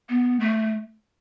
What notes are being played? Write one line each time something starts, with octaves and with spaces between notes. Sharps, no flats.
B3
A3